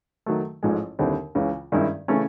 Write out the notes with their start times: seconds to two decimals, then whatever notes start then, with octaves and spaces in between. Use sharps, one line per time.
0.26 D#3 F#3 A3
0.63 A1 G#2 F3 G#3
0.99 D#2 D3 G3 C4 E4
1.35 C#2 C#3 E3
1.72 G2 D#3 G#3 C#4 E4
2.08 C#3 E3 A3 C#4